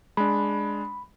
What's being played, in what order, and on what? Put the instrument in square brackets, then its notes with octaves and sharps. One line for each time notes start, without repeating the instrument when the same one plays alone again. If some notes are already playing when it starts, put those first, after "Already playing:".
[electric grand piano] G#3 D4 [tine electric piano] B5